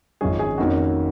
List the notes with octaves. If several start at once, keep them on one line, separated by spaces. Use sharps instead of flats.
G#1 F#2 F3 G#3 C#4 G#4
G#4
F2 D#3 A#3 C#4 F#4